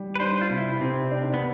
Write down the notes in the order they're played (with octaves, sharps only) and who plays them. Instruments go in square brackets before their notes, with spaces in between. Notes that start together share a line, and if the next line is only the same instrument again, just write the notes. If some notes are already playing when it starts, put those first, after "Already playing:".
Already playing: [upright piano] G3
[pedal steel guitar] B4
[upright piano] D4 [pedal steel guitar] C5
[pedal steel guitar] F4
[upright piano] C3 [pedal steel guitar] E4
[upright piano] C3 [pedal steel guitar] C4
[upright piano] D4
[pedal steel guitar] B3